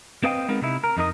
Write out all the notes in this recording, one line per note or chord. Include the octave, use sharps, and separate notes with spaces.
C4 B4 C5 D#5 F5 G5
G#3 B3 C4 D#4 A#4
C3 D#4 E4
A#4
F2 D#4 A#4 D#5